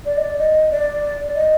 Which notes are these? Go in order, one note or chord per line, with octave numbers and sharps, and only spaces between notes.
D5
D#5
D5
D#5
D5
D#5